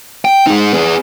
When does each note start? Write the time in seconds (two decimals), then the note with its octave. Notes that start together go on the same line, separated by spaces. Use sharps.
0.25 G5
0.47 D#4 G#4
0.73 B3 G#4